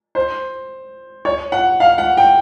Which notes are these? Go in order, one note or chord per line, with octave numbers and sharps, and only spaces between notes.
C5
C#5
F#5
F5
F#5
G5